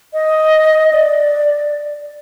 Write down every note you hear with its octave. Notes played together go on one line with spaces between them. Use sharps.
D#5
D5